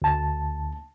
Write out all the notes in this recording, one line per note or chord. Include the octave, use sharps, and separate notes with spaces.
D2 A5